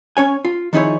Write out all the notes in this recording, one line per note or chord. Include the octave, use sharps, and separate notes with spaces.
C#4 C#5 G#5
F4
D#3 F3 D#4 E4 G#4 C#5